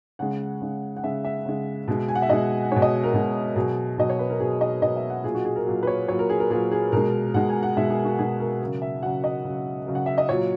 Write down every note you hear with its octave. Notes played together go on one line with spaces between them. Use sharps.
C#3 G#3 F#5
C#3 G#3
F#5
C#3 G#3 E5
E5
C#3 G#3
B2 G#3
G#5
F#5
E5
B2 G#3 D#5
B2 G#3 C#5
D#5
A#4
B2 G#3
B2 F#3 G#4
B2 F#3 D#5
C#5
B4
A#4
B2 F#3 G#4
D#5
B2 F#3 D#5
E5
F#5
A#2 F#3 G#4
F#4
G#4
A#4
A#2 F#3
B4
C#5
A#2 F#3 C#5
A#4
G#4
A#4
A#2 F#3 G#4
G#4
B2 G#3 A#4
B2 G#3 F#5
G#5
F#5
B2 G#3 E5
G#4
F#4
B2 G#3 G#4
A#4
C#3 F#3 A#4
E5
C#3 F#3 F#5
D#5
C#3 F#3
C#3 F#3
F#5
E5
D#5
A#2 F#3 C#5